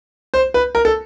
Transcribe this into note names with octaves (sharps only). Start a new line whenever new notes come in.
C5
B4
A#4
A4